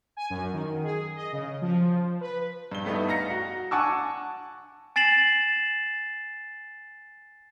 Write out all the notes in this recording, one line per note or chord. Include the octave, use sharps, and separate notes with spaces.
G#5
F#2
D#3
G#4
D#5
C#3
F3
B4
G2 G7
G2 A3 B3 D#4
F5 A#5 A#6 C#7
F#4
F#5 G#5 A5 C#6 D6 E6
G#5 A6 C7 E7 F#7